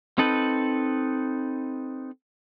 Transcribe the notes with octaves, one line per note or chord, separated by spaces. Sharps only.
C4 D#4 A4 B4